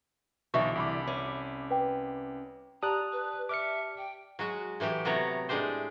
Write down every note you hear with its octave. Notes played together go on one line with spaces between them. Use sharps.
B1 D3 E3 D5 E5 C#6
C2 B5 D6
C#4
B4 G5
G4 D5 A5 A#5 D#6 F#6
B4
E5 D6 F6 C#7
G5
F#3 G#3 F#4
A2 E3 F#3 G4
C3 F#3 A3 B3 C#5 A#5
A2 G#3 D4 G4 C5